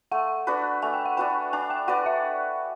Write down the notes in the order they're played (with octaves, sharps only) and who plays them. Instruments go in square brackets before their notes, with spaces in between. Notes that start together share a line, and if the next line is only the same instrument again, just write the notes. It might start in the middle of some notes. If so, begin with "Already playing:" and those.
[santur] A3 [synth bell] F#5
[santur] D4 F#4 B4
[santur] A3 [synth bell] G#5
[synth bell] G5
F#5
[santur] D4 F#4 B4 [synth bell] G5
[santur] D4 [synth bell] G#5
[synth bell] G5
[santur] F#4 B4 D5 [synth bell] F#5
[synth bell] E5